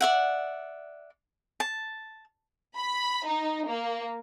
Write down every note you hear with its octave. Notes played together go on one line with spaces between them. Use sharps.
D5 E5 F#5
A5
B5
D#4
A#3